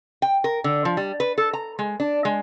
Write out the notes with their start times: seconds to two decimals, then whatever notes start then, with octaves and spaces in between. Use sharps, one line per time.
0.22 G5
0.44 A#4
0.64 D3
0.85 F3
0.97 G3
1.20 B4
1.38 A4
1.53 A#5
1.79 G#3
2.00 D4
2.25 G#3